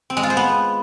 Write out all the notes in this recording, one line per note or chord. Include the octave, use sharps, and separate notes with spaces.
C4
G#3
F4
C5
B3